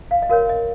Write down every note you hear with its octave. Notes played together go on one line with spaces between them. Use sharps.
F5
D#5
F#4 A#4 C#5 F5
D#5